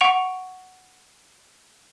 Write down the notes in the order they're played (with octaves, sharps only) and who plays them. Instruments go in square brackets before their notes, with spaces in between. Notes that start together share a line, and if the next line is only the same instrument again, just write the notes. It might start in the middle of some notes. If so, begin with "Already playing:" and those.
[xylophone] F#5 C#6 D7 F7